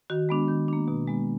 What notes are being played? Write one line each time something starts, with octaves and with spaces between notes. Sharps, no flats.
D#3 F#4
G#3 B3 D4
D#3
A#3 D4
B2
G#3 B3